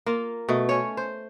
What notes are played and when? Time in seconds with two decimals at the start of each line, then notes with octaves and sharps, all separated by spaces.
0.06 A#3 F4
0.49 B2 A3
0.69 C#4 C#5
0.97 C5